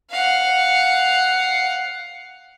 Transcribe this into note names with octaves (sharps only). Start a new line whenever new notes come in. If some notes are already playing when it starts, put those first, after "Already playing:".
F5 F#5